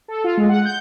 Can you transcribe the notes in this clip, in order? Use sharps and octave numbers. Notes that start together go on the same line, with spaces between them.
A4
F4
G#3
F#5
G6